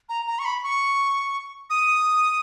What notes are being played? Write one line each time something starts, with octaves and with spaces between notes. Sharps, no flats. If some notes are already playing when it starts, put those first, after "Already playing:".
A#5
A#5
C#6
B5
C#6
D#6